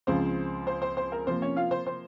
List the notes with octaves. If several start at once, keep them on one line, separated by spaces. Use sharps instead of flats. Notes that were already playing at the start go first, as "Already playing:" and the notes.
C#2 C#3 F3 C4 C5
C5
C5
C5
A#4
C3 F3 A#3 C5
C#4 C#5
F4 F5
C5
C5